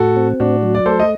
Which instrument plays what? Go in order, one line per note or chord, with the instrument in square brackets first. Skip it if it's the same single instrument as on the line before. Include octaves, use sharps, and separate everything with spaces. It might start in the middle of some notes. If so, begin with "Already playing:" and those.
Already playing: [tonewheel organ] A2 [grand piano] F#4 A4
[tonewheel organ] C4
[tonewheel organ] A2 [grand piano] D4 F#4
[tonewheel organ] F#3
[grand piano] D5
[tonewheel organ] A3 [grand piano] A4 C5
[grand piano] D#5